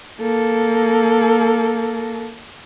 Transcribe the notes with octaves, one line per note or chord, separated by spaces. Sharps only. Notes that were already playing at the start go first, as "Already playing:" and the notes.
A#3 A4